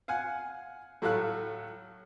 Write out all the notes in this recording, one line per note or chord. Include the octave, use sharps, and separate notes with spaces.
F5 F#5 G#5
A2 F#3 A3 A4 F5 F#6